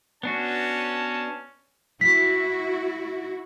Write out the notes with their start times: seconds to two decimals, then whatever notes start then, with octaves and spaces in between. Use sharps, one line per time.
0.23 B3 C#4 D4 F#4 A5
2.01 E4 F#4 B6